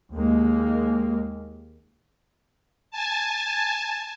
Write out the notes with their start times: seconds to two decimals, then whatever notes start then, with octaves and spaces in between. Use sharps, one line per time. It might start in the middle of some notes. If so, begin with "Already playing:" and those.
0.14 D#2 G#3 A#3
2.91 G#5 A5